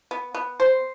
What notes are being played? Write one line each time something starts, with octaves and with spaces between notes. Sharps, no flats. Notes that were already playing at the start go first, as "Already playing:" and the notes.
B3
B3
C5